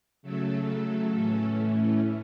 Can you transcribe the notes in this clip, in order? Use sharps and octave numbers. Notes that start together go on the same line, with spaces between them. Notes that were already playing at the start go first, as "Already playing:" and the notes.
C#3 F#3 A3 A4
A2 E3 A3 C#4